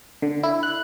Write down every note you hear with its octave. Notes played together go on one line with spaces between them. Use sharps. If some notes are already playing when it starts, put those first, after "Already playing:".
D3
E4
F#6